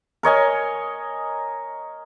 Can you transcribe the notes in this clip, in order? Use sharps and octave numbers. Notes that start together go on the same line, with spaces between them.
A#4 C#5 D#5 G#5